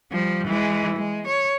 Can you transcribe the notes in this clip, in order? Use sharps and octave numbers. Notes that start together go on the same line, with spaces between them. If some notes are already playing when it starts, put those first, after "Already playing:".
F3 G3
E3 G#3
G#3
C#5